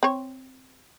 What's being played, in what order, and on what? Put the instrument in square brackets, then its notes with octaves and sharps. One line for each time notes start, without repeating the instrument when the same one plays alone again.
[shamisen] C4 C#5